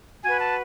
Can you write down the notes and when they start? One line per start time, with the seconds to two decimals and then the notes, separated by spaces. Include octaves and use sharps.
0.23 F#4 B4 G#5
0.40 A5